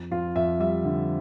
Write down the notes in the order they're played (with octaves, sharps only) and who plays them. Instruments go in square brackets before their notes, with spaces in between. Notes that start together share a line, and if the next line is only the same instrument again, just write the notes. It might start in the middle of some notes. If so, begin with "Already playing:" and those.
Already playing: [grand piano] F2
F2 F4
F2 E5
G3 E5
D3